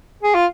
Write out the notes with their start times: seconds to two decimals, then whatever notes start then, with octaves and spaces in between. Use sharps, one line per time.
0.23 G#4
0.34 F4